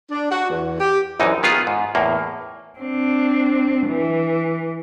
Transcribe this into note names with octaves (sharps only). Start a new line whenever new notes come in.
D4
F#4
E2
G4
A#1 F#2 E3 D#4
D#3 B3 F4 G#4
G#2
E2 A2 A#3
C4 D4
E3